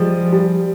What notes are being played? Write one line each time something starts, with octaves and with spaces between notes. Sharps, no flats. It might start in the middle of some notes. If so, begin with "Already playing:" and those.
Already playing: F3 G3 G#3
G3